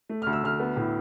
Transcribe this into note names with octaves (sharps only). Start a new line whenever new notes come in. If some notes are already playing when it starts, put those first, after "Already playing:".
A3
D2 F6
E6
D2 F6
B3
A2